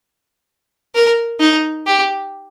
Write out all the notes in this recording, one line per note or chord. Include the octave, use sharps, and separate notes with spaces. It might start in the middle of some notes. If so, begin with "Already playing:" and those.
A#4
D#4
G4